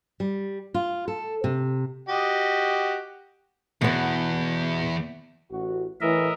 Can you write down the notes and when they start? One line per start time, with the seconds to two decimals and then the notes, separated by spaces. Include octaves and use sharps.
0.20 G3
0.74 F4
1.08 A4
1.44 C3
2.09 F#4 G4 D#5
3.81 E2 B2 B3
5.51 A1 F#4
6.01 A2 E3 A#4 D#5 E5